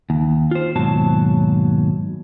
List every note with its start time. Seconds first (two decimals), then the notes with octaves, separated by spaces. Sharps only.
0.10 D#2
0.51 F4 C5
0.76 D#2 G#2 B2 F#3 A5